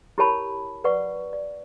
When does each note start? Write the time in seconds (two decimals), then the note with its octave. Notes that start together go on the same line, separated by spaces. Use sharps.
0.18 E4 G4 A#4 C#5 A5 B5
0.84 B4 D5 F#5 C#6
1.33 D5